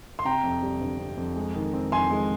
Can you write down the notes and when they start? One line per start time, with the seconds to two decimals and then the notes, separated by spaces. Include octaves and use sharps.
0.19 C6
0.25 C3 G5 A#5
0.44 F2
0.63 G3
0.80 G1
0.99 C3
1.17 F2
1.36 G#3
1.55 D#3
1.74 C4
1.92 F2 G#5 C6
2.10 G#3